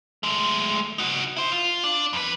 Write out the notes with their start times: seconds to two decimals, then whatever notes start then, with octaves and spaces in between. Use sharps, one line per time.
0.23 G#3 A3
0.98 D#4 F#4
1.36 E4 C5
1.52 F4
1.84 D4
2.13 F2 B4